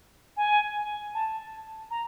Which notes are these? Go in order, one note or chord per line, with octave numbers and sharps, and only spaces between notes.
G#5
A5
A#5